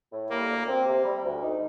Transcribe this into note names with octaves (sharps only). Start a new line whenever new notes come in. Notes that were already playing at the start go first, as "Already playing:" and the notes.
A2
G3 A#3
D2
C4
C3
G3
D2
D#4